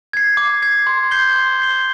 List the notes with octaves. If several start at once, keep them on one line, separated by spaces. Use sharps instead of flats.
G#6 C7
D6
G#6 C7
C6
G6 C7 G7
C6
G6 C7 G7